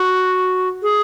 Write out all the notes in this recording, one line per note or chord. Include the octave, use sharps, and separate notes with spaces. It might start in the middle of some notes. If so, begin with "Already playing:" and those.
Already playing: F#4
G#4